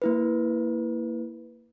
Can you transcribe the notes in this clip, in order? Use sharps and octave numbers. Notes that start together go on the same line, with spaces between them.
A#3 E4 B4